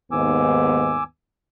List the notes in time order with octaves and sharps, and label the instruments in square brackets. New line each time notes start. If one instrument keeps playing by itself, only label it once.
[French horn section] D#2 G#2 B3 [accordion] G#5 D6 E6